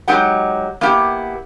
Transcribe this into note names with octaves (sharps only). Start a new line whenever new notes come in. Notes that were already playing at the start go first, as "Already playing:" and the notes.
F#3 G#3 D#4 G4 F#5
A#3 B3 E4 G4